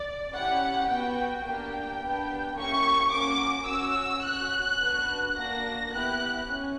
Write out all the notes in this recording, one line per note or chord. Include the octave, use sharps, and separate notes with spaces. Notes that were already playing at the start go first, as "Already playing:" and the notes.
Already playing: D5
C#4 E4 G4 F#5
B3 F#4 G5
A#3 D4 G4 G5
B3 D4 G4
A#3 C#4 E4 G4 C#6
A#3 C#4 F#4 D6
C#4 F#4 E6
C#4 F#4 F#6
B3 D4 F#4
A#3 D4 F#4 A#6
B3 E4 G4 F#6
C#4